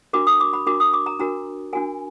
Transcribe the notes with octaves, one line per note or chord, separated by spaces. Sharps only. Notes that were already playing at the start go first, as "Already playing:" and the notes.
D4 F#4 A#4 D6
D#6
D6
B5
D4 F#4 A#4 D6
D#6
D6
A#5
D4 F#4 A#4 A#5
D4 F#4 A#4 G#5